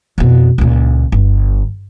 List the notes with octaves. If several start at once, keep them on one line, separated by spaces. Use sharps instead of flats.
F2 B2
C#2 A#2
G1